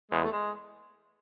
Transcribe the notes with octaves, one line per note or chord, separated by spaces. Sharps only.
E2 G#3
A3
G#3